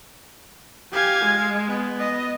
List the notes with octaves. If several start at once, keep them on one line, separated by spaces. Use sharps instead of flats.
G4 F5 G#5 G#6
G#3
B3
D#5